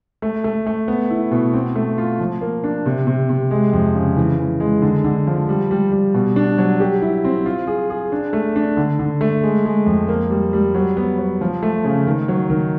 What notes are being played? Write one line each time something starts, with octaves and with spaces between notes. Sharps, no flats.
A3
A3
A3
B3
E4
B2
C4
A3
F4
F3
A#3
D4
C3
C3
C3
G#3
F2
C#3
E3
E3
G#3
D3
D3
F3
G3
G3
G3
B2
D4
F#3
G4
E4
C4
F4
G#4
G#4
D4
A3
D4
D3
D3
A3
G#3
G#3
F2
A#3
G3
G3
F#3
B3
F#3
F3
A3
C#3
D#3
F#3
D#3